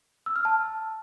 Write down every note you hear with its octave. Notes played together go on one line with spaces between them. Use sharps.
E6
F6
A5